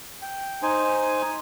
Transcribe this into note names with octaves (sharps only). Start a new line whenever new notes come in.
G5
D#4 C5 G#5